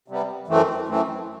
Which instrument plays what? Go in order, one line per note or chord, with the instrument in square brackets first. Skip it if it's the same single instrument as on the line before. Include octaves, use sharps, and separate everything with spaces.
[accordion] C3 G3 B3
F#2 E3 A3 C4
F#2 E3 A3 C4